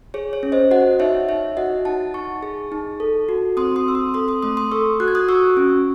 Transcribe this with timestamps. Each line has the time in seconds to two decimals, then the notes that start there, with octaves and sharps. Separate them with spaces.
0.14 G#4 C#5
0.33 C#5
0.43 C#4
0.52 C5 D#5
0.71 F#4 D#5 F#5
1.00 D#4 C#5 E5
1.29 D#4 C#5 E5
1.57 F#4 D#5 F#5
1.85 D#4 F#5 A5
2.14 D#4 A5 C#6
2.43 G#4
2.72 D#4
3.00 A4
3.29 F#4
3.57 C4 C6 D#6
3.76 C6 D#6
3.86 C4 E6
3.95 C6 D#6
4.14 A4 C6 D#6
4.28 C6 D#6
4.42 A3 C6 D#6
4.57 C6 D#6
4.71 A4 C#6 E6
5.00 F#4 F#6
5.08 G#6
5.15 D#6 F#6
5.28 F#4 C#6 E6
5.57 C#4